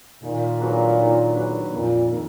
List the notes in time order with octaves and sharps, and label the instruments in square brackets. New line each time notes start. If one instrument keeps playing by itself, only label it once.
[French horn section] A#2 [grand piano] D#3
[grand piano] F#3 D4 G#4 B4
D#3
F#3 D4 G#4 B4
[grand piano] F2 [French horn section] A#2
[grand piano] D#3 A#3